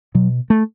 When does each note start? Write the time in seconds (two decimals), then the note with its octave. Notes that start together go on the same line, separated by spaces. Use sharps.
0.15 B2 F#3
0.50 A3